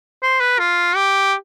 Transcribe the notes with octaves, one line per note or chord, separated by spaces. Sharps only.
C5
B4
F4
G4